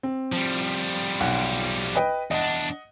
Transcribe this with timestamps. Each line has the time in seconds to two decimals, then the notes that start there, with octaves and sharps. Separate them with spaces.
0.03 C4
0.32 F3 G3
1.20 B1 F#5
1.95 B4 D#5 G5
2.31 E2 D4 D#5 F#5